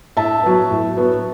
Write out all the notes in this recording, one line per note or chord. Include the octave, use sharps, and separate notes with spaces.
A2 E5 A5
F#3 B3
A2
F#3 B3